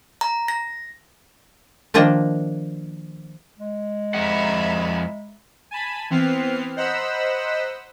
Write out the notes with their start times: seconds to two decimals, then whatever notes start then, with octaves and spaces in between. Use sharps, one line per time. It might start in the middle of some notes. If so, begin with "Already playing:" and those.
0.21 A#5
0.48 A#6
1.94 D#3 F3 A#3 D4 D#5
3.58 G#3
4.14 F2 G#4 E5 F#5 A#5 B5
5.71 G#5 A5 B5
6.10 E3 B3 C4 F6 C7
6.76 C5 D#5 F#5 A#5 B5 E6